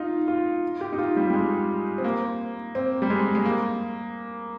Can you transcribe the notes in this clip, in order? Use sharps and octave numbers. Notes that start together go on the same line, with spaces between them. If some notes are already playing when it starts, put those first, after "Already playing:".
Already playing: D#4 F4
F4
G4
D#4
F4
G3
G3
G#3
C4
A#3
C4
G3
G#3
G#3
A#3